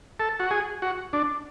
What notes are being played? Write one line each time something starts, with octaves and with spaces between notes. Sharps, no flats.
A4
F#4
G#4
F#4
D4